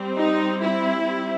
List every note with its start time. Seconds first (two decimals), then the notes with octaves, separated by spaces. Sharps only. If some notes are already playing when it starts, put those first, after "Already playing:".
Already playing: G3 C4
0.16 D#4
0.61 E4
1.06 G3 C4